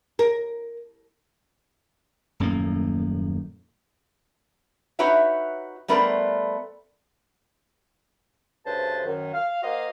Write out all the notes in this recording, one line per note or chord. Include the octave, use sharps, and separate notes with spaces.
A#4
D#1 F#2 A2 A#3
D#4 F#4 B4 C#5 E5
G3 A3 B3 A#4 C5 D5
D2 G2 C#3 B4 C5 A5
F#2 D#3
F5
A#3 F#4 C5 D#5 F5